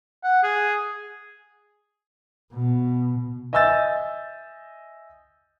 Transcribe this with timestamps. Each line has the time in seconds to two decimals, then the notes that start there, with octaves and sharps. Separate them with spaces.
0.24 F#5
0.43 G#4
2.53 B2
3.53 D#5 E5 G#5 E6 G6 A6